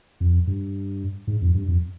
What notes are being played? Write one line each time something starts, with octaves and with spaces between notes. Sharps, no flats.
F2
G2
G#2
F2
G2
F2